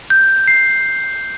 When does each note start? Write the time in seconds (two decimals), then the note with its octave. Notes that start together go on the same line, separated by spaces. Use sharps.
0.10 G6
0.48 C7